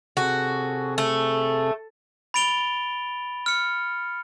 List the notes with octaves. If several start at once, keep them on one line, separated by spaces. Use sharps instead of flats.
C3 F#4 G#4 A4
A3
B5 A6 D7 F7 G7
F6 C#7